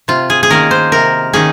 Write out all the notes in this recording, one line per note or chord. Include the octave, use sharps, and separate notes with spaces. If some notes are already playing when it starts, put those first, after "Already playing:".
C3 F4
G#4
G#4
D#3 A#3 C#4 A#4
C5
C3 A#4
D#3 A#3 C#4 G#4